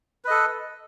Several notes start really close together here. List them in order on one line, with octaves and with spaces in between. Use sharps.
B4 D#5 A4